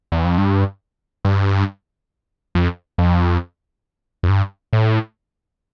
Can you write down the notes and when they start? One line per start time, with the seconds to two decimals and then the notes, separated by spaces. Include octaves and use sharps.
0.12 E2
0.25 F2
0.38 G2
1.25 G2
2.55 F2
2.98 F2
4.23 F2
4.29 G2
4.73 A2